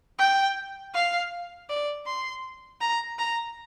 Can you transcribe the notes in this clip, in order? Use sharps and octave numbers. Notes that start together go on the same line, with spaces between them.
G5
F5
D5
C6
A#5
A#5